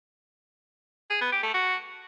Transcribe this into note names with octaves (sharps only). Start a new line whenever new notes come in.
G#4
B3
G4
A3
F#4